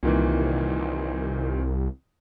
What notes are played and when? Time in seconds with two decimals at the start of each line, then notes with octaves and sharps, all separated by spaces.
0.03 C2 A#2 D#3 E3